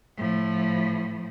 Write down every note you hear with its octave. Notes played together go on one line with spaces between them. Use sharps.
A2 F3